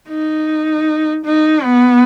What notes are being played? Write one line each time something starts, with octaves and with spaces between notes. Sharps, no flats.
D#4
D#4
B3